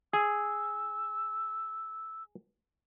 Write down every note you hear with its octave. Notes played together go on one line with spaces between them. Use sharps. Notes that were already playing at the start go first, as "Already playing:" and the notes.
G#4 E6